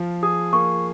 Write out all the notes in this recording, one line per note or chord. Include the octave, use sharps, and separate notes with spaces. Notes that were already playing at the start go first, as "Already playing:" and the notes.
Already playing: F3 F4
G#4 D#6
A#3 C#6